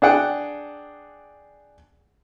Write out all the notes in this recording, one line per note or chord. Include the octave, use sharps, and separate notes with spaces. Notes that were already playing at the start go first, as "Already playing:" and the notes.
D4 G#4 F#5 G5